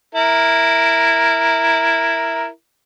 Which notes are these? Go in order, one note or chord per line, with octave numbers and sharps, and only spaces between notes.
E4 A#4